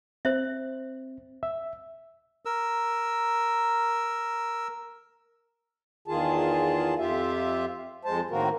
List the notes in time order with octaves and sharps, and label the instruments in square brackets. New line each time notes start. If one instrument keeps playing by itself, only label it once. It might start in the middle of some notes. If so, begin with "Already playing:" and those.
[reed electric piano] C4 [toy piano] C5 E5
[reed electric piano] E5
[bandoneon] A#4 E6
[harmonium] E2 D#3 F4 G#4 A5
F2 F4 G4 E5
F2 G#3 C5 A5
A2 D#3 A#3 C4 F#4 A#4